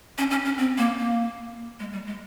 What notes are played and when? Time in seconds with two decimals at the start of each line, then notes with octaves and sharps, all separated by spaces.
0.18 C#4
0.31 C#4
0.45 C#4
0.58 C4
0.78 A#3
0.98 A#3
1.80 G#3
1.93 G3
2.06 G#3